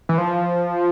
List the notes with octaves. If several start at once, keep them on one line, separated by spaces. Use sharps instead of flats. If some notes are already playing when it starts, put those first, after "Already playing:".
E3
F3